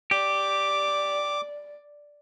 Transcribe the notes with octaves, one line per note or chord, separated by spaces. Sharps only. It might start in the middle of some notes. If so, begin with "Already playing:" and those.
G4 D5 D6